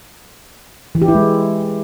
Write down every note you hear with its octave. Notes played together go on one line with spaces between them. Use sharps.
E3
G4
E4
G#3